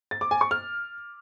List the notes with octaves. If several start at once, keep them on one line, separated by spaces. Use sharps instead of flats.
A6
D6
G#5
C#6
F6